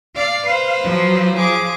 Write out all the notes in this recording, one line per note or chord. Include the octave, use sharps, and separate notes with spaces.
D5 F5
B4 C5
F3 F#3
F3 G#4 D6